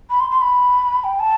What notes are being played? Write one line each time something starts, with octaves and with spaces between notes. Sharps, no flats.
B5
C6
C6
B5
G5
A5